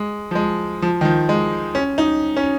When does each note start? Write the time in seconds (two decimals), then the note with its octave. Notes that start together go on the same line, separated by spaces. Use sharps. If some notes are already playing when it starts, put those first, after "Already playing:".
Already playing: G#3
0.31 F3
0.35 G#3
0.82 F3
1.01 D#3
1.05 F3
1.29 G#3
1.75 C#4
1.98 D#4
2.37 C#4